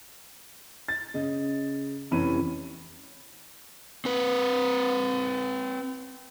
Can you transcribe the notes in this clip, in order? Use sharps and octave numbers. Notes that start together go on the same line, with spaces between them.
A6
C#3 D#5
F1 C3 E3 C#4 B5 D#7
C4 B4